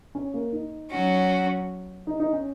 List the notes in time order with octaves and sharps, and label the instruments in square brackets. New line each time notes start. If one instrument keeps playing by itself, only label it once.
[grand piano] C#4
A#3
D#4
[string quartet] F#3 C#4 F#4
[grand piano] D#4
D#4
C#4